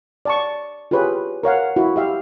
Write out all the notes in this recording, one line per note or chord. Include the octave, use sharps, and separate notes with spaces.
D5 A5 C#6
F4 G4 G#4 B4 C#5
A#4 C#5 F5 F#5
E4 F#4
G4 E5 F5